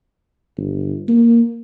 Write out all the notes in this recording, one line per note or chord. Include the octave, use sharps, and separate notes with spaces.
G1
A#3